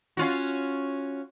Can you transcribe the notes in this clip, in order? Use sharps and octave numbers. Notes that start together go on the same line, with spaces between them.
C#4 F4 F#4